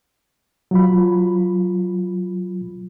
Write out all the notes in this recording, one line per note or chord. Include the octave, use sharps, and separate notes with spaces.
F#3 F4 B5